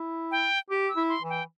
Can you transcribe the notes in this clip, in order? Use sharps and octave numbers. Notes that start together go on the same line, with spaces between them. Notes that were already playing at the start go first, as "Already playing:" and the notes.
Already playing: E4
G5
G4
E6
E4
C6
E3
G5